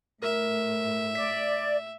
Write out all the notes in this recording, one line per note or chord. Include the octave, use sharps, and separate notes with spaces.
A2 A#4 E5
D5 B6